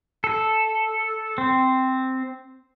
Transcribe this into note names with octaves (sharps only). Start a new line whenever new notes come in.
A4
C4